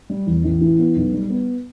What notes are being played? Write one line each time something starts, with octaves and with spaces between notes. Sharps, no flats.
G3
E2
A1
E3
B3
B1
G3
B3